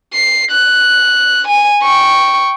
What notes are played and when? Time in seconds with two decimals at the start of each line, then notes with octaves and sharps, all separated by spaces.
0.13 C7
0.51 F#6
1.48 G#5
1.82 G5 C#6